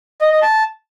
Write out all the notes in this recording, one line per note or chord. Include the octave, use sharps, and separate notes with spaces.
D#5
D#5
A5